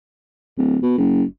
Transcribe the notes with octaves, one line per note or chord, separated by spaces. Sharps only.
D1
B2
F#1